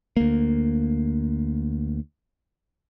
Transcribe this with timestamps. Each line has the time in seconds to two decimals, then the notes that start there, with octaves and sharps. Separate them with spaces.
0.17 D2 A#3